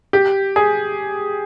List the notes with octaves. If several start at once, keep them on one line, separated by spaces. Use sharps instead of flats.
G4
G#4